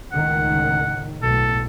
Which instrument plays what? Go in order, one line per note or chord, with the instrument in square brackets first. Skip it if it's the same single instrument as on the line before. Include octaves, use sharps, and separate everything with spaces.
[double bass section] C#2 A2 D#3 [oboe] F#5
[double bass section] B1 A2 [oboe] A4